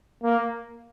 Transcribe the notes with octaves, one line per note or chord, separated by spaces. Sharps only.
A#3